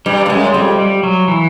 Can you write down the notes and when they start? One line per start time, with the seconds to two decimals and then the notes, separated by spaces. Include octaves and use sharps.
0.06 G2 G3
0.26 G2
0.29 F#2 G#3
0.54 F2 G3
0.78 G3
1.03 F#3
1.28 E3